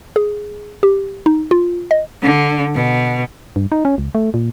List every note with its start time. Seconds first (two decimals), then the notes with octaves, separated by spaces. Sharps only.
0.16 G#4
0.83 G4
1.26 D#4
1.51 F4
1.91 D#5
2.22 D3
2.75 B2
3.56 G2
3.72 D#4
3.85 C#4
3.98 C#2
4.15 A3
4.34 A#2